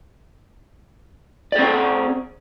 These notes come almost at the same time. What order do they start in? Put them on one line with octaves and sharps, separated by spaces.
D5 G#4 C4